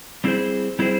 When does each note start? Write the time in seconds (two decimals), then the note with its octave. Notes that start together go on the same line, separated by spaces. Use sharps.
0.24 G3 C4 E4 G#4 C5
0.79 G3 C4 E4 G#4 C5